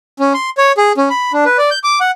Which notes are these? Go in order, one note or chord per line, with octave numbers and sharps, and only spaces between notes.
C#4
C6
C#5
G#4
C#4
B5
D4
B4
D5
G6
D6
F#5